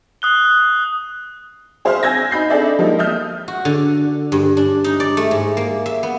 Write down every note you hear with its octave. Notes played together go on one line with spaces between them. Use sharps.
D#6 F#6 G7
G#4 C5 E5 F5 C6 F6
G#5 E6 G6 G#6 A#6
D#4 B5 G6 C7
D4 D#4 G#4 A4 D5 E5
F3 G3 G#3 A#3 D#4
E5 D#6 F6 G6
F#4
D3
G2
D4
D#4
D5
A3
G#2
A#3
E5
B3